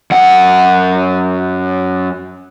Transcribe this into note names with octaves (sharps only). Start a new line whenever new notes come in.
F#2 F#5